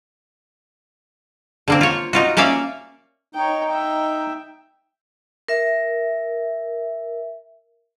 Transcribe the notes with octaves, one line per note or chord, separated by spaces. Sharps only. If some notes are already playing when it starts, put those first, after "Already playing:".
D3 A#3 C4
F4 C#5
D#4 F4 F#4
A#3 C#4 D5 E5 F5
D#4 C#5 G5
E5 G5
A#4 E5